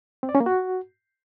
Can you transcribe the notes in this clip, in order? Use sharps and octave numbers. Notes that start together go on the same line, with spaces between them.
C4
D5
C#4
A#3
F#4